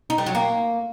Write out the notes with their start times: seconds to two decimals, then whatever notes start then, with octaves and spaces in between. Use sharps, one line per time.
0.10 D#4
0.18 G3
0.26 F#3
0.35 A#3